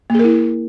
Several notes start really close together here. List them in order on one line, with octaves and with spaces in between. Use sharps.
A#3 G#4 A#4 E4